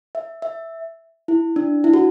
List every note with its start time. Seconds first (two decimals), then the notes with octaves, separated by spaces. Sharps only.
0.15 E5
0.42 E5
1.28 E4
1.56 D4
1.84 E4
1.94 F#4